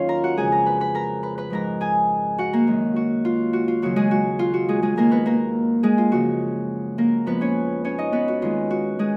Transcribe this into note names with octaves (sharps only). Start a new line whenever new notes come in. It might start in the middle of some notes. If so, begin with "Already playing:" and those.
Already playing: D#2 D#3 F#3 C#4 F4 C#5 F5
A#4 A#5
F#4 F#5
F2 C#3 G#3 G#4 G#5
A#4 A#5
B4 B5
B4 B5
A#4 A#5
B4 B5
B4 B5
G#2 F3 G#3 A#4 A#5
G#4 G#5
F#4 F#5
A#3 A#4
F#2 D#3 G#3
F#4
F4
F#4
F4
D#2 C#3 F#3 F#4
G#3 G#4
F#4
F4
F#4
G#3 G#4
G#3 G#4
D#2 D#3 G#3 A#3 A#4
B3 B4
A#3 A#4
G#3 G#4
F4
F#2 C#3 F3 G#3 F#4
A#3 A#4
F2 F3 G#3 B3 B4
C#4 C#5
C#4 C#5
D#4 D#5
B3 B4
F#4
D#2 D#3 G#3 F4
F#4
G#3 G#4